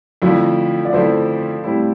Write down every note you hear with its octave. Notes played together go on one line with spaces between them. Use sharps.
F2 D3 F3 A3 E4 F4 A4
D5
F2 D3 F3 A3 E4 A4 C5
A2 G3 C4 E4